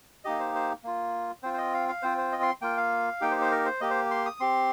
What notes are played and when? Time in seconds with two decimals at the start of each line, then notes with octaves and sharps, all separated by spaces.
0.24 A#3 D#4 G4 D#5
0.39 C5
0.55 C5
0.84 A#3 F4
1.43 C4 F4 C5
1.53 C5
1.58 D#5
1.74 F5
1.89 F5
2.02 C4 F4 C5
2.18 C5
2.32 D#5
2.43 C6
2.62 A#3 F4 G5
2.77 F5
3.21 A#3 D#4 G4 G5
3.31 C5
3.41 C5
3.51 A#4
3.65 C5
3.81 A#3 G4 D#5
3.90 C5
4.11 C6
4.26 D#6
4.40 C4 G4 C6